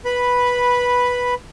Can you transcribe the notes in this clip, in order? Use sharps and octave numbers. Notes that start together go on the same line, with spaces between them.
B4 B5